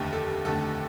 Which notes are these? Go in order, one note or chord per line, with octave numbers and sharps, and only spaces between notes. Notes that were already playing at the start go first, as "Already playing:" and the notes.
Already playing: F1 D#2 D3 A3 G4
A4
F1 D#2 D3 A3 A4